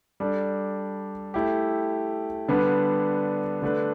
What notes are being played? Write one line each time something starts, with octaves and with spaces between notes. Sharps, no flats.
G3 D4 A4
A3 E4 G4
D3 G3 B3 D4 B4
D3 A3 D4 B4